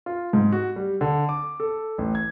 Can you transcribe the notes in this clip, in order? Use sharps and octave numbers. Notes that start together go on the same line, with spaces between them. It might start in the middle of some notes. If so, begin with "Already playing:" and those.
F4
G#2
F#4
G3
D3
D6
A4
A1
G#6